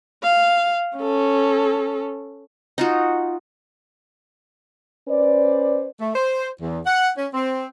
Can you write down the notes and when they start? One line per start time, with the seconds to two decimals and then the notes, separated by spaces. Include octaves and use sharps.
0.23 F5
0.97 C#4 A4
2.78 D#4 F4 F#4
5.09 C#4 B4 C5 D5
6.00 A3
6.15 C5
6.62 E2
6.86 F#5
7.17 C#4
7.34 C4